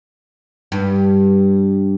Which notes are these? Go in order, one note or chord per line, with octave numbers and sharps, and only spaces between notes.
G2